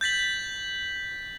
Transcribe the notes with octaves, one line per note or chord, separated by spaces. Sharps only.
G6 A6 B6 F#7